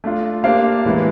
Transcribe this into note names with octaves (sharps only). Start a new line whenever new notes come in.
A3 D4 F4
A#3 D4 G4 C5 F5
A2 E3 G#3 B3 E4